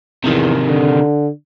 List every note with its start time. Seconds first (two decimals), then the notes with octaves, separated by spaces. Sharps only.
0.24 E2 C3 D#3
0.68 D3